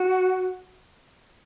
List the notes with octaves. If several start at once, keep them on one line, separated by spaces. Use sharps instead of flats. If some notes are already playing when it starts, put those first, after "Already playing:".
Already playing: F#4